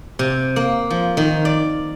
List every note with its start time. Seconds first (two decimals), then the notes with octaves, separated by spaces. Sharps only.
0.19 C3
0.56 A#3
0.90 F3
1.17 D#3
1.45 D5